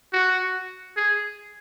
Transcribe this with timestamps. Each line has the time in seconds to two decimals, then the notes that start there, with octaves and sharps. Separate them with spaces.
0.13 F#4
0.97 G#4